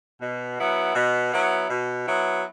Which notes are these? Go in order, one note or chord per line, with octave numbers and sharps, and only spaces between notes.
B2
F#3 B3 E4
B2
F#3 B3 E4
B2
F#3 B3 E4